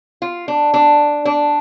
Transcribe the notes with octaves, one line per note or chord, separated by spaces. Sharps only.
F4
D4
D4
D4